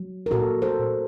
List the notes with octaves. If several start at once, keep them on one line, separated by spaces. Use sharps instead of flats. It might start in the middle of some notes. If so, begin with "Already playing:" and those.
Already playing: F#3
A#4
A#2 F#4 A4
A4 C5
A#2